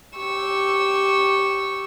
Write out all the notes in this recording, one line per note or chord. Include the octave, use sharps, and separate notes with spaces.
G4 C#6 E6